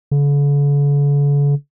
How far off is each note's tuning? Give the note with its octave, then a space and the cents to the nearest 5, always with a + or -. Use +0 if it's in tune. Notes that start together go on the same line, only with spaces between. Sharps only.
D3 -45